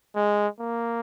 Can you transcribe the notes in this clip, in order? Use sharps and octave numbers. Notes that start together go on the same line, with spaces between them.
G#3
A#3